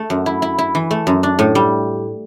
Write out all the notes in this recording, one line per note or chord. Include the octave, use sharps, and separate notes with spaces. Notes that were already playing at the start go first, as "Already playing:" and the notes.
Already playing: A3
F#2
E4
E4
E4
E3
A3
F#2
D4
A2
G3